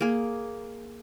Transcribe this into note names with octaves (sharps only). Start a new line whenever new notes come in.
A#3 G#4